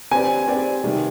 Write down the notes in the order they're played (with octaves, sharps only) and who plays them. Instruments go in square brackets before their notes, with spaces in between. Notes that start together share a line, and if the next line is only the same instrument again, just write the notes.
[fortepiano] C4 G4 B4 D5 [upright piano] G#5
[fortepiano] C4 G4 B4 D5
C3 D#3 G3